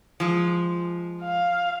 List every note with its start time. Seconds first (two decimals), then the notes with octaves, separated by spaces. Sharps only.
0.20 F3 G#3
1.22 F5